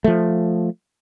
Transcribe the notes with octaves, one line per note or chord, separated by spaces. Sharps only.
F3 A3